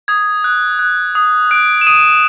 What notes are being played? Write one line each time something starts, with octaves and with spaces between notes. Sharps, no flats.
D#6 G#6
F#6
F#6
D#6
F#6 D7
E7
D#6 D#7